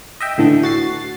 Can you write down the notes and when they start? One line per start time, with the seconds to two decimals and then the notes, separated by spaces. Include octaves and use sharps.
0.20 D#5 E5 G5
0.38 A2 D3 E3 A3
0.63 F#4 A6 C7